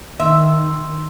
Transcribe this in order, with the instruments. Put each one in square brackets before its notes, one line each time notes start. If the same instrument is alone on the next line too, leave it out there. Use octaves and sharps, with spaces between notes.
[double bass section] D#3 [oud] E5 [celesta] C6 E6